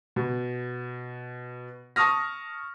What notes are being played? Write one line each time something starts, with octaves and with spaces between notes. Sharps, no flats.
B2
A5 C#6 D#6 F6 A#6